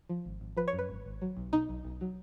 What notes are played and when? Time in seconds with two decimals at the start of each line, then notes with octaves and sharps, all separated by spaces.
0.09 F3
0.25 G#1
0.41 G#1
0.57 F3 B4
0.68 C#5
0.73 F#2
0.79 B4
0.89 G#1
1.06 G#1
1.21 F#3
1.37 B1
1.52 B2 D#4
1.69 B1
1.85 B1
2.01 F#3